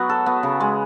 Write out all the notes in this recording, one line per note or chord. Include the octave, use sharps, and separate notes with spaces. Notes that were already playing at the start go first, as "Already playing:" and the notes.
Already playing: F#3 B3 F#4
A4
B3
C#3
G#3